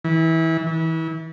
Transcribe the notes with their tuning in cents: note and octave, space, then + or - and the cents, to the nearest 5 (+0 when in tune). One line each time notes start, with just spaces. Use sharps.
E3 -25
E3 -30